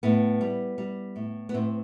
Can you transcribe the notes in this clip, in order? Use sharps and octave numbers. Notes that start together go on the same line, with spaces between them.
A2 B3
G3
G3
A2
B3
A2 C4